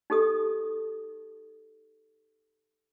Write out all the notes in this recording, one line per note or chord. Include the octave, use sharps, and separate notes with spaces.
D#4 G4 A4 D#6